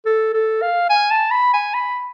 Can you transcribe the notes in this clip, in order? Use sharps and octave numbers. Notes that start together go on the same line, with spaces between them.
A4
A4
F5
G#5
A5
B5
G#5
B5